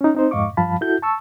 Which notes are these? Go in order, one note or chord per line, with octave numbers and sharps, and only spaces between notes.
C#4 D#4
C4 D#4 C5
F2 G#2 D#5 F5 C#6 D6
G2 F3 F5 A5 B5
E4 F#4 A4 G6
A5 C#6 E6